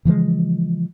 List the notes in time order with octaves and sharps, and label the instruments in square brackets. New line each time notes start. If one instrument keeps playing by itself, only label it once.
[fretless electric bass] C#3 E3 F3 G#3